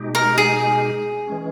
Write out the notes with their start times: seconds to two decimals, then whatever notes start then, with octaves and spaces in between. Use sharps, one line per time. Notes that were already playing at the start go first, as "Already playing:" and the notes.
Already playing: B2 G#3 D#4 G4
0.15 A#4
0.38 G#4
1.27 E3 G#3 C#4